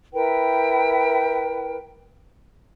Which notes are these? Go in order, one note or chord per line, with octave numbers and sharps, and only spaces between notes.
E4 A#4 B4 G5